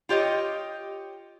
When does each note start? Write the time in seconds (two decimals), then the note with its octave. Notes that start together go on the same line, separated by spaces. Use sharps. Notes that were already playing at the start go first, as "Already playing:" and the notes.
0.09 F4 G4 C#5 D#5